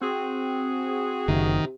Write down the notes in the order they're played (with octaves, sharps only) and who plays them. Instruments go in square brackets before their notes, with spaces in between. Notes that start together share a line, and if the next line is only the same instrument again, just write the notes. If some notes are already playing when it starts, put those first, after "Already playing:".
[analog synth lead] C4 [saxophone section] F#4 G#4
[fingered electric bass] F#1 [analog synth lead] C3 [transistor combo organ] D#3